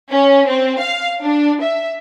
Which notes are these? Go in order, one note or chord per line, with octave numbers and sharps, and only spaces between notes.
C#4
C4
F5
D4
E5